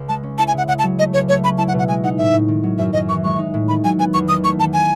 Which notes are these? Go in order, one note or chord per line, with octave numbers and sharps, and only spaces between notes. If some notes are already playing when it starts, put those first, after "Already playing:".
Already playing: C#2 C#3
G#3 A5
C#4
E4 A5
G#5
C#3 F#5
C#3 F#5
A5
F#3
A3 D#5
C#2 C#5
A3 C#5
C#4 B5
E4 A5
F#5
B2
F#5
G#3 G#5
D#4 F#5
A2 E5
A2
D#3
F#3
F#2 E5
F#2 D#5
E3 C#6
G#3 C#6
D#4
A2
D#3 B5
F#3 G#5
B3 G#5
E2 C#6
D#3 D#6
A3 C#6
E2 A5
G#5